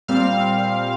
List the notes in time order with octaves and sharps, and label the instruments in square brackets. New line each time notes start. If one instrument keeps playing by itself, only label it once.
[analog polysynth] A#2 G3 C4 F5